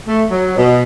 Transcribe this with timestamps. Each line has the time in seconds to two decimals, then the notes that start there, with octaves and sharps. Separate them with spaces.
0.07 A3
0.30 F#3
0.57 B2